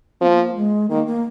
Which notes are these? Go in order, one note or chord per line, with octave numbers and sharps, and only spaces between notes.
F3 A#3 C4
G#3
D#3 A#3
A#3